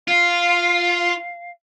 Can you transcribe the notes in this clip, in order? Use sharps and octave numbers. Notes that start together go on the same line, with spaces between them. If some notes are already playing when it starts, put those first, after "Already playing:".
F4 F5